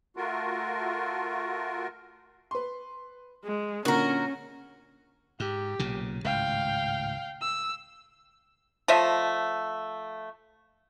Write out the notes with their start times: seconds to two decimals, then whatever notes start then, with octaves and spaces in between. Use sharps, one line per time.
0.17 A3 F4 F#4 A#4
2.51 B4 C6
3.45 G#3
3.85 A#2 D3 A#3 C#4 F#4 A#4
5.40 G#2 G4
5.79 B1 A#2 C#3
6.25 G#1 C#2 A2 F5 G5
7.41 E6
8.88 F3 A3 D#5 E5